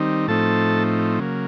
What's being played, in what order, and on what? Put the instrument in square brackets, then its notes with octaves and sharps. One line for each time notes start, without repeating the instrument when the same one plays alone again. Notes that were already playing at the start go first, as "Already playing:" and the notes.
Already playing: [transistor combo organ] D#3 G3 C4 D#4
A2 F3 A3 C4 D#4 A4 A5
C#3 F#3 A#3